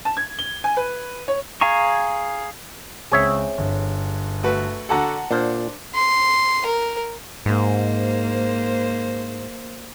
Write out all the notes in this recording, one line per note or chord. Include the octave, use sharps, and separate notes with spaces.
A5
G#6
G7
G#5
B4
C#5
G#4 F5 G#5 A#5 C#6
C#2 C4 G#4 C#5 E5
G1
A3 F#4 B4
D3 F#4 A4 F#5 A5 A#5
A#2 D4 C5
C6
A#4
G#2 A#3 C5